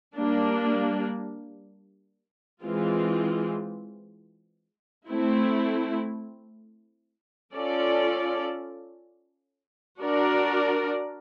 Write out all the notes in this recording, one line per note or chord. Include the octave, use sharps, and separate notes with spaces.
G3 A#3 D4
E3 G#3 C4 F4
A3 C4 E4
C#4 F4 A4 D5
D4 F#4 A#4 D5